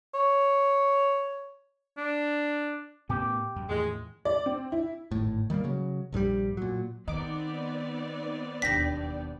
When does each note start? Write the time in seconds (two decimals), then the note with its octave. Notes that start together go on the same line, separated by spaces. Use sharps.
0.14 C#5
1.98 D4
3.09 A2 B3 C#4 G4
3.56 F#2
3.69 E2 A2 D#3 G#3
4.25 D5
4.46 C4
4.72 E4
5.11 G#1 A2
5.50 D#3 G3 A3 A#3
5.64 C#3 F#3
6.13 A#1 G2 D3 G3
6.57 A#2 F#3
7.08 D#3 B3 C4 D#4 D5 D6
8.62 E1 D#2 D4 G5 A#6 B6